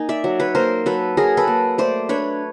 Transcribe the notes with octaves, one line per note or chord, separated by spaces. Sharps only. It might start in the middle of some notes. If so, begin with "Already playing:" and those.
Already playing: A#3 D#4 G#5
D5 E5
F#3
B4 C#5
A#3 A#4 C5
F#3 A4 B4
F#3 G#4 A#4
A4 B4
A#3
A3 C5 D5
D4 B4 C#5